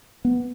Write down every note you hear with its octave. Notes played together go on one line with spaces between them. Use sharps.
B3